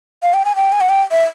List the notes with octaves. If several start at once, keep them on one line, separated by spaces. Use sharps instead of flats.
F5
G5
G#5
G5
G#5
F#5
G5
E5